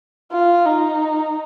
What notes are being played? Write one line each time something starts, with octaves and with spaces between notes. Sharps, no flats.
F4
D#4